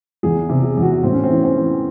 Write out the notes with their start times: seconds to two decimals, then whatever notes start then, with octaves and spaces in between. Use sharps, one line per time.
0.23 E2 G#4
0.49 C3
0.63 G#4
0.77 E2
0.83 F#4
1.03 A2 C4
1.13 C#4
1.24 C4
1.30 E3 C#4
1.44 C4
1.57 E3